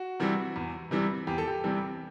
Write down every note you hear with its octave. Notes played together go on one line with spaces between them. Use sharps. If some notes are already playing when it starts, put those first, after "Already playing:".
Already playing: F#4
C3 E3 G3
E2
C3 E3 G3
E2 G4
A4
G4
C3 E3 G3